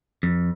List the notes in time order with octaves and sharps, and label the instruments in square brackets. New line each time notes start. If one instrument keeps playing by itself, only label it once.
[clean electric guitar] F2